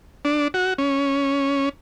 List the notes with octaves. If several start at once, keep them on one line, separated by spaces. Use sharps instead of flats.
D4
F#4
C#4